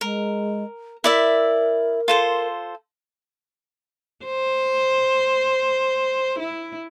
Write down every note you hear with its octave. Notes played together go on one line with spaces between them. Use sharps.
G#3 A#4
E4 A#4 D5 E5
F4 A4 C5
C5
E4